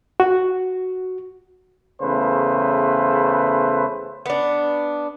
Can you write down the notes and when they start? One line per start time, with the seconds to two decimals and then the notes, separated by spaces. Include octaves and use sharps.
0.20 F#4
2.01 E2 C#3 A3 B4 C5
4.26 B3 D4